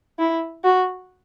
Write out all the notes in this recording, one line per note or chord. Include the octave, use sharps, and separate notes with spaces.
E4
F#4